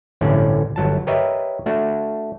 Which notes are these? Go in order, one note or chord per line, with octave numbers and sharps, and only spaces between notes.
G1 C2 A2 D3 C#4 D5
G1 F#3 A5
G4 A#4 B4 C#5 D#5 E5
A3 D4 F#4